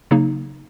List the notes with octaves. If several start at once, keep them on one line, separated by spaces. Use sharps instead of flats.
C#3 F#3 A#3 D#4